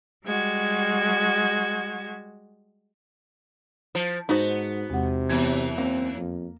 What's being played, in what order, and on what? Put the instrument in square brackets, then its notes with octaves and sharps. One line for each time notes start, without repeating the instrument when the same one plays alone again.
[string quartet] G3 G#3 F#4 G#6
[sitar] F3 [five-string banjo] C5
[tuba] G#2 [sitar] B3 [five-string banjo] D#4 F#4 C5
[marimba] E2 G#3 F#5 [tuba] C3
[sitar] F#2 E3 [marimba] B3 G#6
[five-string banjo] A#3 [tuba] C4
[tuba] F2